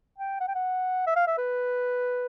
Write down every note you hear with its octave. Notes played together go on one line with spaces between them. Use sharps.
G5
F#5
G5
F#5
E5
F5
E5
B4